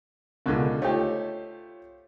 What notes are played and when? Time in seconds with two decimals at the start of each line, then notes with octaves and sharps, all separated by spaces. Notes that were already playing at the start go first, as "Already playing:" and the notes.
0.46 C#2 B2 D3 A#4 G#6
0.82 A3 D#4 F4 G4 C5 C#5